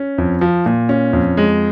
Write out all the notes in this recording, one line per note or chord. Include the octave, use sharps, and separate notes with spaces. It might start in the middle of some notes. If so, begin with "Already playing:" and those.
Already playing: C#4
F2
F3
A#2
C#4
F2
G#3